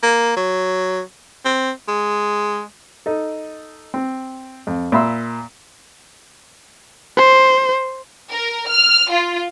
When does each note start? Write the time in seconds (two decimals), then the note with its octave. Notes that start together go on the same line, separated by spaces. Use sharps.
0.03 A#3
0.36 F#3
1.45 C4
1.88 G#3
3.06 D#4 A4
3.94 C4
4.67 F2
4.92 A#2 E5 B5 C6 E6
7.17 C5
8.30 A#4
8.67 F6
9.11 F4